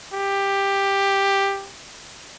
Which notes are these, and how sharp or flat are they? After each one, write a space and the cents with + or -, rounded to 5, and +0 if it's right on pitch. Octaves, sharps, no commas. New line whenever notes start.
G4 +10